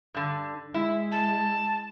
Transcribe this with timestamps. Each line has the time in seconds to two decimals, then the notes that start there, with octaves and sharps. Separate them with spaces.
0.14 G2 D3
0.74 G#3 E4
1.12 A5